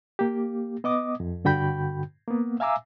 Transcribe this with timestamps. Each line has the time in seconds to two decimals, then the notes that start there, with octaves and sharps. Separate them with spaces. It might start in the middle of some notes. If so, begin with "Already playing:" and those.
0.19 A#3 G4
0.84 B3 D#5 D6 D#6
1.20 F2
1.45 G2 D3 F#4 G5 B5 G6
2.27 A#3 B3
2.60 E5 F5 G#5 A#5 D6 E6